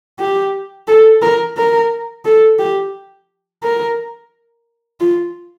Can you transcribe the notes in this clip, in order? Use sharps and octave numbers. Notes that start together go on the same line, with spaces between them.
G4
A4
A#4
A#4
A4
G4
A#4
F4